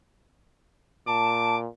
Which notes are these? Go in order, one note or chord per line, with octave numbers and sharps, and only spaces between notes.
A#2 A5 D6